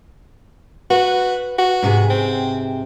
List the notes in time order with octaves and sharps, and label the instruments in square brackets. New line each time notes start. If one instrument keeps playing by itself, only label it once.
[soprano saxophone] F#4 [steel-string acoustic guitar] B4
[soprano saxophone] F#4
[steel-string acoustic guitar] G#2 C3 G#4
[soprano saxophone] C4